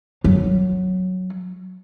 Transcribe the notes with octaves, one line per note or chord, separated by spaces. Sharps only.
F#3